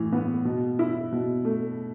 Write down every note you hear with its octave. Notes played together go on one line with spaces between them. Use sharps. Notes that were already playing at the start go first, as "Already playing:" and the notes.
Already playing: A2 E3
B3
B2
E4
B2
A3